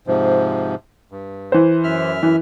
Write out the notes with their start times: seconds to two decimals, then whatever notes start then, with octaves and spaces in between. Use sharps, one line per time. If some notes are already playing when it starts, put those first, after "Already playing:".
0.07 G#2 C3 F3
1.11 G2
1.52 E3 C5
1.84 F#2 E5 F6
2.23 E3